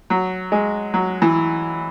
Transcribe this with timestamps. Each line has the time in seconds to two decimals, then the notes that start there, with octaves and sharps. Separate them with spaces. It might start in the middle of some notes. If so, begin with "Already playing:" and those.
0.10 F#3
0.52 G#3
0.94 F#3
1.22 E3